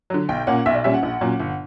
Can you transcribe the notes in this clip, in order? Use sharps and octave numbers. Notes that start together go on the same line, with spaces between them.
D3 F#3
B1 G5
A#2 A#3 C#4 F#5
B1 E5
D5
A#2 G3 C#4 E5
F#5
A#1
A#2 F#3 C#4
G1